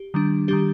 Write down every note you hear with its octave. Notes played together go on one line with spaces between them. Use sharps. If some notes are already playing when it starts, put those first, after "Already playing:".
Already playing: G4
D#3 G3 D4
D#3 G3 D4 G4